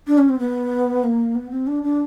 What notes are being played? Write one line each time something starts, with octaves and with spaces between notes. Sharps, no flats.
D4
C#4
C4
B3
A#3
B3
C4
D4
D4